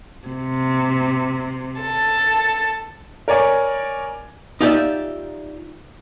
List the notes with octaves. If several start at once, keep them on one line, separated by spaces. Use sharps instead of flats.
C3
A4 A5
A#4 C#5 D5 G#5
D#4 F4 G4 C#5 D5 E5